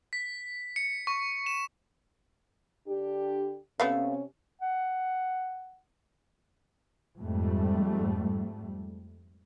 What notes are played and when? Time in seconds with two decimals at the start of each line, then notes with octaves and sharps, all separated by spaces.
0.13 B6
0.76 C#7
1.07 C#6
1.46 E7
2.86 D3 D4 G4
3.80 C3 A3 B3 C#4 F5
4.61 F#5
7.17 F2 G#2 G3 A3